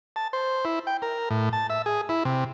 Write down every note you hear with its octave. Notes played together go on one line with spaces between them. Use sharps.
A5
C5
E4
G5
A#4
A2
A5
E5
G#4
E4
C3